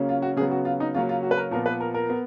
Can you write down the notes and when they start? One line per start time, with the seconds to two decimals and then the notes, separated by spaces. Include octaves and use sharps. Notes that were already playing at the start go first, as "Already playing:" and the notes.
Already playing: C#3 F#3 A#3 C#4
0.09 F4
0.22 F#4
0.36 C#3 F#3 B3 G#4
0.51 F#4
0.65 F4
0.80 D#4
0.95 C#3 F#3 A#3 C#4 F4
1.09 F4
1.23 F#4
1.31 B4
1.37 A#4
1.51 A#2 F3 B3 A#4
1.66 B4
1.80 A#4
1.94 A#4
2.10 B3